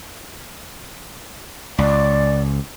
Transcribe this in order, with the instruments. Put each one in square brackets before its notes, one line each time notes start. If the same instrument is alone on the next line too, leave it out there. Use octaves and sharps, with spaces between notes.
[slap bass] C#2 [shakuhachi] D5